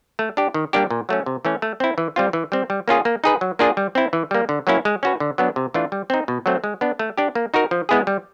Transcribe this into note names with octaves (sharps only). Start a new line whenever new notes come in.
A3
D4 G4
D#3
G3 A#3 D4 G4
A#2
F#3 A3 C#4
C3
E3 A3 C#4
A3
C4 E4
E3
G3 C4 F4
E3
G3 C4
G3
A#3 C#4 F4 G#4
A#3
D#4 G#4 B4
F#3
A#3 D4 F4 G#4
G3
C4 E4
E3
G3 A#3
D3
F#3 A#3 C#4 E4
G#3
C#4 F#4 B4
D3
F#3 B3 D4
C3
E3 A3 D4 F4
G3
C4 D#4
B2
F#3 A3 C4
G#3
B3 D4
A3
D4 G4
A#3
D#4 F#4 A#4
F3
G#3 B3 E4 G#4
G3